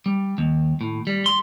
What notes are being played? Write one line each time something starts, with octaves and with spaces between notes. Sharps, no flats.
G3
D#2
A2
G3
C6